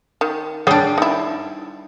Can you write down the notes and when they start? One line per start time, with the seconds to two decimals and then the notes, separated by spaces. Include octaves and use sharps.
0.21 D#3
0.67 G3 D4 G#4 C#5 F#5
0.98 D#4 E4